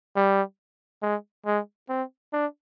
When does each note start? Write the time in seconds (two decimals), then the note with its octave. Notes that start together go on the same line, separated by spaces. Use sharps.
0.16 G3
1.02 G#3
1.46 G#3
1.89 C4
2.33 D4